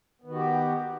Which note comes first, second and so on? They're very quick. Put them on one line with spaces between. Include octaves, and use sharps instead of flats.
B3 D#3 F#4 G4